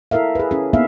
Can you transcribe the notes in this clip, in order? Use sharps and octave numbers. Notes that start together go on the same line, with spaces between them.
E4 A4 A#4 E5 F5
G#4 B4
C#4 E4 G#4
A#3 B3 D#4 E5 F5